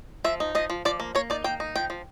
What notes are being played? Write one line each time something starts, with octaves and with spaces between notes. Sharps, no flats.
F3 E5
D#4
F3 D#5
F3
F3 D5
A#3
A#3 C#5
D#4 D5
A#3 G5
D#4
F3 G5
F3